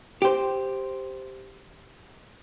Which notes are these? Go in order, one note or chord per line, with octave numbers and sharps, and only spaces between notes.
G4 C5